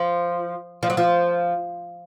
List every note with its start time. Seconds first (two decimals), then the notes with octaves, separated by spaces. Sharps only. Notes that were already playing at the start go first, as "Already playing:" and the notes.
Already playing: F3
0.83 F3
0.90 F#3
0.97 F3